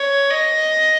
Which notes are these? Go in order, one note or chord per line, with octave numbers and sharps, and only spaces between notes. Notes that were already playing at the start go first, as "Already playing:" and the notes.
Already playing: C#5
D#5